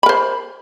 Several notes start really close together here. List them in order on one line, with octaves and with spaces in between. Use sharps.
B5 A#4 C5